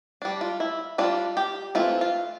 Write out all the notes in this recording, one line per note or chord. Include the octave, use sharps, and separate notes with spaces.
G3 D4
F4
E4
G3 D4 F4
G4
E3 A3 C4 F4
F4